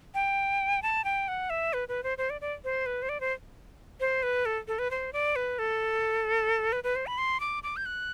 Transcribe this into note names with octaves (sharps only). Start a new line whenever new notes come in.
G5
A5
G5
F#5
E5
B4
B4
C5
C5
D5
D5
C5
B4
C5
D5
C5
C5
B4
A4
A4
B4
C5
D5
B4
A4
B4
B4
C5
B5
C6
D6
D6
G6
F#6